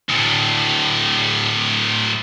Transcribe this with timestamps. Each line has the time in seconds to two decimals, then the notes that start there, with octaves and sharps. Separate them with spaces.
0.09 D2 A2